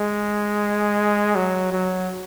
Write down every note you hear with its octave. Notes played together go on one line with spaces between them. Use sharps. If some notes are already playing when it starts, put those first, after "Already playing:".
Already playing: G#3
F#3
F#3